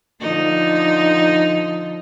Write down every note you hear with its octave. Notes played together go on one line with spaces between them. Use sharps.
D3 F3 D#4